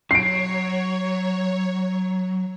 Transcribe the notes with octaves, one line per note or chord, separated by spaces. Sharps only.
F#3 C#5 C7 D7